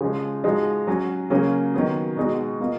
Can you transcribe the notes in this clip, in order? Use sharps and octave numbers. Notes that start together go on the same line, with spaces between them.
C#3 F3 G#3
F3 G#3 D#4 F#4
F#3 C#4 F#4
C#3 F#3 A#3 C#4
D#3 F#3 B3
B2 G#3 D#4 F#4
B2 A#3 F4